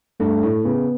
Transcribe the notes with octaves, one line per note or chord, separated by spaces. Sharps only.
G2 A3
A2
C#3 B3